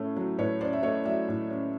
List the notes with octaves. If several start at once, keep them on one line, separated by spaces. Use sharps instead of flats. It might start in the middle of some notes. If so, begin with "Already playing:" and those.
Already playing: A2 A3 C#4
F#3
A2 B4 C#5
C#4 C5 D5
E5
A3 C#5 D#5
F#3 D5 E5
A2
C#4